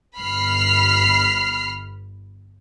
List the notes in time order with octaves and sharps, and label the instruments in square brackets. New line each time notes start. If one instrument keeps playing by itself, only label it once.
[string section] G1 B5 F6 C7